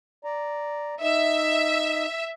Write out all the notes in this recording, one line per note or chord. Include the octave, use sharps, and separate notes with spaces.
D5 A#5
D#4 D#5 E5